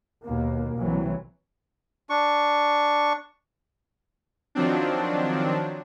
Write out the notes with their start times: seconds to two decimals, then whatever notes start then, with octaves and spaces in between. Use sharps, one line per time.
0.24 D#2 B2 A#3
0.78 C2 C3 E3 F#3
2.10 D4 C#6
4.55 D#3 F3 F#3 C4 D4